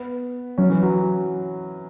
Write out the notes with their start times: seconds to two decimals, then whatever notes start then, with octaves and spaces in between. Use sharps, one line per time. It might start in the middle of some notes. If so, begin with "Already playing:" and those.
Already playing: B3
0.58 F#3 C#4
0.70 E3
0.82 F#3